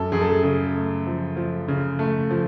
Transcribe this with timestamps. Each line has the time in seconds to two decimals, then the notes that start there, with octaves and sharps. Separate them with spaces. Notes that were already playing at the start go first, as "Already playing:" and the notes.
Already playing: F#2 A4
0.12 F#2 G#4
0.21 A4
0.30 G#4
0.43 C#3 G#4
0.75 A3
1.07 F3
1.37 F3
1.68 C#3
1.99 A3
2.31 F3